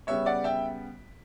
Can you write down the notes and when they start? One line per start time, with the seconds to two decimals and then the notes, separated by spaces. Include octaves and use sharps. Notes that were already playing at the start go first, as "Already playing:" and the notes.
0.07 C#3 G3 B3 C#5 E5
0.26 D5 F#5
0.44 E5 G5